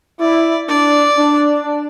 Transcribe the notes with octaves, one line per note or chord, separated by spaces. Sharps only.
E4 D5
D4 D5
D4